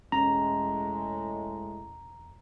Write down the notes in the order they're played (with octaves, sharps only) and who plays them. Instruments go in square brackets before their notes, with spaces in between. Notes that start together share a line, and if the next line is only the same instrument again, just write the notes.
[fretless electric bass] E1 C#4 [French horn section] A2 G#3 [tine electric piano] A#5